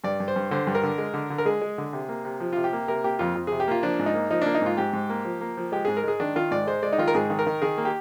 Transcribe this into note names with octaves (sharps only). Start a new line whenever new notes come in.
G2 D5
G2
C5
G2
D3 C5
G2
A#4
D3
G#3
D3
D3
A#4
G#3 G#4
G#3
D3
C3
A#3
C3
F3
C3 F4
G4
A#3
C3 A#4
A#3 G4
F2 F4
F2
C3 G#4
G4
A#3 F4
F3 D4
G#2
D#4
A#3
F3 D#4
A#3 D4
D#4
G#2 F4
G#2 G4
G#2
A#3
F3
A#3
F3
G#3 G4
G#2 G#4
A#4
G#3 G#4
D#3 D4
D#3 F4
G#2 D5
G#3 C5
G#3 D5
D#4
D#3 F4
A#4
G#2 G#4
D#3
A#4
D#3
D#3 G#4
A#3
G4